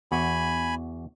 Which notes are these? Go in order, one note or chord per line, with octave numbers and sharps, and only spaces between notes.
E2 F#4 G#5 B5